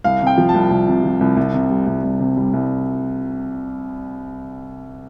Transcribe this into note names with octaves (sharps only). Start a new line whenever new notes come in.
C2 F5
C3
G5
F3
A5
C2
C2
C3
F3
C2
C2
C3
G3
C2
C2
C3
G3
C2